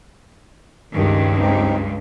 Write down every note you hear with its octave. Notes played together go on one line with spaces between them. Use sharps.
C#2 G2 D#3
C4 D#4